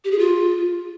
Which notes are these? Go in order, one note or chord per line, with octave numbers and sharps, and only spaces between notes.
G4
G#4
F4